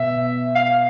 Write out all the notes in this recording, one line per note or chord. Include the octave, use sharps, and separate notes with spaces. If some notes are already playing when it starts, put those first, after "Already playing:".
Already playing: B2 E5
F5